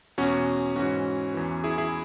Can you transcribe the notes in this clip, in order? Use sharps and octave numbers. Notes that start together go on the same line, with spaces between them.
E2 B2 C#4 F#4
G#2 E3 C#4 F#4
E2 E3
E4 G#4
E4 G#4